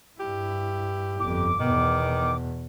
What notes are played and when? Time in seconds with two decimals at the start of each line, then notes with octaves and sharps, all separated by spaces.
0.20 G2 E4 G4
1.20 G1 F2 D6
1.60 E2 B2 D#3